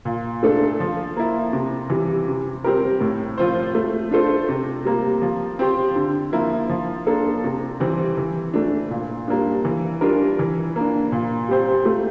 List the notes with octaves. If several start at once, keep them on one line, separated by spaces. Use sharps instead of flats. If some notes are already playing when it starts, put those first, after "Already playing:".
A#2
A3 D4 A4
F3
A#3 E4
C3
E3 G3
C3
G3 C4 G4 A#4
A2
F3 C4 F4 C5
A3
D4 F4 A4 C5
C3
G3 A#3
F3
C4 G4 C5
D3
F3 A#3 E4
F3
A#3 D4 A4
C3
E3 G3 C4
E3
A3 D4
A#2
G3 A#3 D4
E3
G3 D4 F4 A#4
E3
A#3 D4
A#2
G3 C4 G4 C5
A3